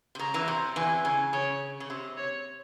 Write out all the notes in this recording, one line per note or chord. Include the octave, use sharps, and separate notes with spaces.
C3
C#3 A#5
E2 E3
C3
E2 E3 G#5
C#3 G#5
C#3 C#5
C#3
C3
C#5